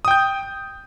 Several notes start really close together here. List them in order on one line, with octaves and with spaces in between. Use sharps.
D#6 G5 G6